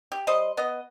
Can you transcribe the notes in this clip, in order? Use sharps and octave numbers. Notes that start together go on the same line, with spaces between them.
G4
G3 C5 D#5
B3 D#5